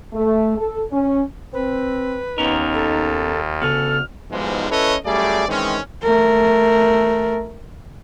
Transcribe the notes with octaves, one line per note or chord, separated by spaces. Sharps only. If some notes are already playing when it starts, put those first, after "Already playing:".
A3
A4
C#4
C4 B4
D#2 B3 C#4 D#4 A#4
A4
D2 C#3 B3 A4 F6
B1 E2 G#2 F3 G3 G#3
C#4 E4 A4 B4 C#5 D#5
F#2 G3 A3 G#4 D5
D#3 E3 G#3 C4 C#4
A3 A#4